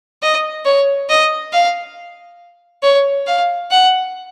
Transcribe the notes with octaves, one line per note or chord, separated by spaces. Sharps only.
D#5
C#5
D#5
F5
C#5
F5
F#5